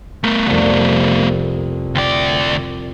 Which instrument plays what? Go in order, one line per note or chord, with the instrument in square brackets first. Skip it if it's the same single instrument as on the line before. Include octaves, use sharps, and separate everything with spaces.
[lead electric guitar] A3 B3 [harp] A#4
[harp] C2 F2
[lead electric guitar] D2 D5 [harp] G5 D6